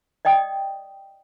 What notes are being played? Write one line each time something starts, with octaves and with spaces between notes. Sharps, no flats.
D5 D#5 G5 D#6